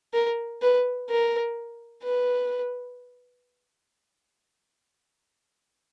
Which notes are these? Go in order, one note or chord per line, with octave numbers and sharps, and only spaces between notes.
A#4
B4
A#4
B4